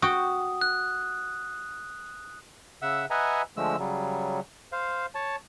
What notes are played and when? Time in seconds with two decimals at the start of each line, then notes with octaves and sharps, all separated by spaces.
0.02 F#4 G5 D#6
0.61 F#6
2.82 C#3 E5 F#5 E6
3.10 B4 D#5 E5 F#5 G#5 A#5
3.57 D3 F3 G#3 A3 E6
3.79 C#3 F#3 G3
4.72 C5 F5
5.15 C#5 A5